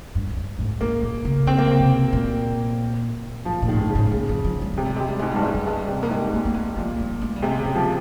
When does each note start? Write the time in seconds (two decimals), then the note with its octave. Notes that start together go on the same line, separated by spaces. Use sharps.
0.15 G2
0.37 G2
0.59 G#2
0.81 G#2 A#3
1.02 A#2
1.25 C#3
1.46 C#3 C4
1.58 A#3
1.71 C4
1.80 C3
2.13 A#2
3.45 G#2 F3
3.62 A#2
3.68 D#3
3.73 G#2
3.79 G2
3.90 C#3
3.95 G#2
4.11 A#2 C#3
4.29 F3
4.44 F3
4.62 G3
4.74 C3 G#3
4.85 G3
4.96 C3 G#3
5.08 G3
5.19 G#2 G#3
5.31 G2 G3
5.43 G#2 G#3
5.54 G3
5.67 G2 G#3
5.77 G3
5.88 C3
6.02 A#3
6.10 G#2 G#3
6.33 A#3
6.45 A#3
6.54 G#3
6.76 A#2 F3
6.99 G3
7.22 G#3
7.36 G3
7.42 C3 G#3
7.59 C#3
7.65 G#3
7.76 F3